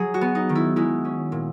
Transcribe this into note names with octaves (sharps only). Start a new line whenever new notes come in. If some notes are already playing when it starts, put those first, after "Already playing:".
Already playing: F#3 G#4
F#4
B3
D#4
D#3
E4
G#3 E4
C#4
A#2